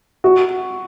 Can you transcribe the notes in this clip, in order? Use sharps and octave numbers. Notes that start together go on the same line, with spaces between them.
F#4